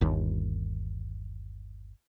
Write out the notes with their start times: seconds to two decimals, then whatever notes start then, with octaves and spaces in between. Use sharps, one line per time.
0.01 G1 D#2